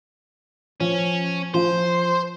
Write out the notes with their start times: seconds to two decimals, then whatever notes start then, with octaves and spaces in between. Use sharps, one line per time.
0.80 F3 C#4
1.54 F3 F4 C5